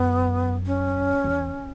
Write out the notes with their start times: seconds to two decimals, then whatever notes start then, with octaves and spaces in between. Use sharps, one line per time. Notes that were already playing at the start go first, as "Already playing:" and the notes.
Already playing: F#2 B3
0.66 C#4
1.24 E2